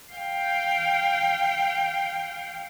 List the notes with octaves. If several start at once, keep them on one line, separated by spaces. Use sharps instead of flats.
F5 G5